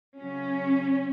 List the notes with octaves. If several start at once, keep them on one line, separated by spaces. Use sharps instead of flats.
C#3 F#3 C#4